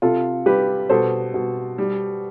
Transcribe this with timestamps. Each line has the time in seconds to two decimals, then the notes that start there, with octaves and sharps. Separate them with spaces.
0.02 C3 F4 A4
0.46 G3 G4 B4
0.89 B2 A4 C5
1.34 B2
1.78 G3